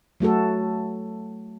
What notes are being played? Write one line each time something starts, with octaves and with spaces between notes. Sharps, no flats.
F#3 A3 F#4 A4